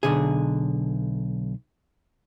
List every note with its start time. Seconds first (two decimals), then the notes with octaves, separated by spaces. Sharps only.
0.03 B1 D3 G#4